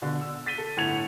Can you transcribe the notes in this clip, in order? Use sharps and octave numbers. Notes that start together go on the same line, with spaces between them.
B2 D3
E6
A6 B6 D#7 G7
A4
G1 A2 F#5 G#6 C#7 F7